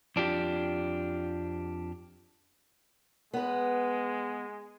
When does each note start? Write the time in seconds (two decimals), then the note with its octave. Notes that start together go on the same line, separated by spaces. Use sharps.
0.16 F2 D4 F4 G4
3.34 G#3 B3 B4